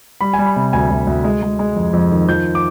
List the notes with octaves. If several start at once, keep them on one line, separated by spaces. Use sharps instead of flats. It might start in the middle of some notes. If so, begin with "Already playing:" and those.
G3 B5
G3 G#5
B5
C3
D2 G#5
D2
D2
G#3
G#3
G#3
F2
F2
D#3
F3 G6
D6